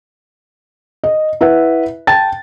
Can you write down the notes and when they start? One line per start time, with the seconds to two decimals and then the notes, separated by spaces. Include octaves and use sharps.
1.04 D#5
1.41 E4 B4 E5 F#5
2.07 G5 A5 A6